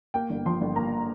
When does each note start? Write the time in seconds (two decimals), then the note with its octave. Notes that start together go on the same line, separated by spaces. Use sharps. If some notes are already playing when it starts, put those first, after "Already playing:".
0.14 A#3 G5
0.30 G1
0.46 F3 C6
0.61 G1
0.76 A#3 A#5